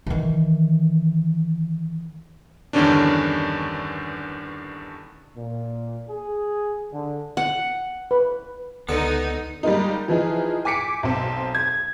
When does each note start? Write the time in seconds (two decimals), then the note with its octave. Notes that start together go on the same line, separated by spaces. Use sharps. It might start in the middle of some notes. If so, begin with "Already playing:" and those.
0.06 D#3 E3
2.73 E2 G2 D3 D#3 C#4 D4
5.36 A#2
6.09 G#4
6.93 D3
7.37 F#5
8.11 B4
8.89 C#2 D3 B3 D#4 A4
9.63 G3 G#3 A#3 D#4
10.08 E3 F3 D#4 G#4
10.65 G#5 D6 B6 C#7 D7
11.03 B1 C4
11.55 G#6